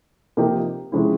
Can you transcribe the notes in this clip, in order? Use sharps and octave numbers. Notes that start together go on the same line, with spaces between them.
C3 F3 A#3 D#4 G4
C3 F3 G#3 C#4 E4